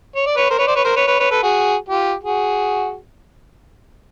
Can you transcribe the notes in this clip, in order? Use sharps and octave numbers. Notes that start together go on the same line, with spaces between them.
C#5
D5
B4 C#5
A#4 C5
B4 C#5
C5 D5
B4 C#5
A#4 C5
B4 C#5
B4 C#5
B4 C#5
A4 B4
F#4 G#4
F4 G4
F#4 G#4